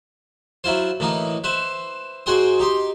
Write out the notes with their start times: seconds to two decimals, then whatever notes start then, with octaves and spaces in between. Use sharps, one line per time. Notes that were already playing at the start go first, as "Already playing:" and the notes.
0.64 F#3 E4 F4 C5
1.00 A2 E3 A#3 D#4
1.44 B4 C5 E5
2.26 G#2 F#4 G#4 G5 C6 D#6
2.59 D#4 G4 C6